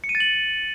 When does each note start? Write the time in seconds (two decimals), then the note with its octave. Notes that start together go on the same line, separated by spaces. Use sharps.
0.04 C#7
0.09 D#7
0.15 A6
0.20 F#7